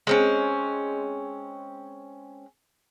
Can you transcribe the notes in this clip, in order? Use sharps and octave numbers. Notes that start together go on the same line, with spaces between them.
G#3 C4 C#4